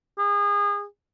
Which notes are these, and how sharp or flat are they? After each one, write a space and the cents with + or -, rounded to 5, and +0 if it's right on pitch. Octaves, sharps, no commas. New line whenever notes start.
G#4 -30